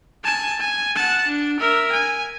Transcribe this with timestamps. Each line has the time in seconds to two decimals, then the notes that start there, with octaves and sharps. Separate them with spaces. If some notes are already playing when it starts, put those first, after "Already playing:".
0.24 G#5 A5
0.60 G#5
0.96 F#5 A5
1.26 D4
1.60 A#4 E5
1.93 G#5